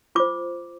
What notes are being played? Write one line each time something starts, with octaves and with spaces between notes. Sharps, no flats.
F4 C5 D6